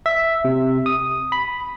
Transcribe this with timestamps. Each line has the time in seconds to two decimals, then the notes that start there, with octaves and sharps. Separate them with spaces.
0.06 E5
0.45 C3
0.86 D#6
1.32 B5